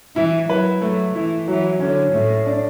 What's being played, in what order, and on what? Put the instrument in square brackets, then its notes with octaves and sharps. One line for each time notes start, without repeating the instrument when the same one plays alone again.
[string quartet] E3 [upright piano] E4
[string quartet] F#3 [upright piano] B4
[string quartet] F#3 [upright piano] A3
[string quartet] E3 [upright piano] E4
[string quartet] E3 [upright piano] F#3
[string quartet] D3 [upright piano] C#4
[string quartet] A2 [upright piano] A3
[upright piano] D4